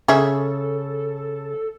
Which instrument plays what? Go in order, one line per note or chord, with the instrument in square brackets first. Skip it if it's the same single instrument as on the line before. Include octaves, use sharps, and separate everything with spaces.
[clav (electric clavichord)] C#3 [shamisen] C#4 G#4 E5 [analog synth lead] A4